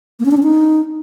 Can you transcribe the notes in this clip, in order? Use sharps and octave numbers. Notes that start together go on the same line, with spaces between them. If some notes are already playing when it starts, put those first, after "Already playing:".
A#3
C#4
D4
C#4
D#4